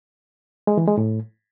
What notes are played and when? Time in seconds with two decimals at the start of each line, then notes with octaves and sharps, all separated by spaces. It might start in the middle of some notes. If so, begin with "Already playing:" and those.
0.67 G#3
0.77 E3
0.87 G#3
0.98 A2